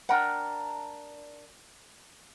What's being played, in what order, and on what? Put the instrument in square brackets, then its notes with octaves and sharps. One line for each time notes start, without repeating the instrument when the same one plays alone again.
[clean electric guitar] D4 A#4 [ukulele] F#5 G5